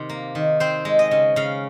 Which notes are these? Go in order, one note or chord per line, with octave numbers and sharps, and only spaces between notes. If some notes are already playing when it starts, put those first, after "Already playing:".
Already playing: C3 D#3
A#3
D#3
C4 C5
G#3
D#5
C#3
C#3 F5